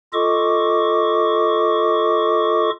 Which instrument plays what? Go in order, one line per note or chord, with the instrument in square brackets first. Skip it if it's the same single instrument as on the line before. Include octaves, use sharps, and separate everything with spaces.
[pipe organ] F4 A4 D#5 C#6 D6